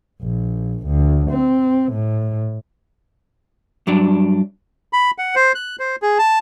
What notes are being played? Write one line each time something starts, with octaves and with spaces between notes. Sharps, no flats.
A#1
D2
C4
A2
G2 F#3 D4
B5
F#5
C5
F#6
C5
G#4
A5